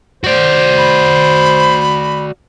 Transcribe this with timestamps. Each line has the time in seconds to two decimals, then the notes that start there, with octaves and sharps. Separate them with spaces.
0.24 F#4 C5 D5
0.77 B5